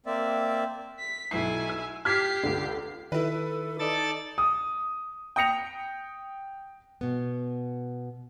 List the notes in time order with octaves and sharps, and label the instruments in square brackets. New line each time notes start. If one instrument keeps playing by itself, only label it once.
[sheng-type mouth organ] A#3 C4 D5 E5
[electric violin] B6
[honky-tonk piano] B1 C7 [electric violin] E4 G#5
[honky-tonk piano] E6
[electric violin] G4 C7 [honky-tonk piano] F6 G#6 B6
[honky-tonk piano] C#2 D3
[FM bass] D#3 [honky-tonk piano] E4 B4 [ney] A4
[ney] D#4 [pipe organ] A4 D5 A6
[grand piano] D#6
[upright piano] G5 D#6 A#6 C#7 F7
[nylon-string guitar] B2 B3